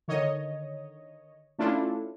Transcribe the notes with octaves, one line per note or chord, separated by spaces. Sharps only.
D3 D#3 C#5 D#5
A3 C#4 D4 E4 F4 A4